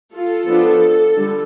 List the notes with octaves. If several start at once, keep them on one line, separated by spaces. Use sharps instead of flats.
F4 A4
F3 B3 D4 F4
D3 G3